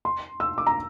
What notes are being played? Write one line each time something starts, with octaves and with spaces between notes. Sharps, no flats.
C6
E6
D6
A#5